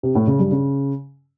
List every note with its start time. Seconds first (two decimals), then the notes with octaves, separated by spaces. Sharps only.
0.03 C3
0.15 A2
0.27 C#3
0.39 G2
0.51 C#3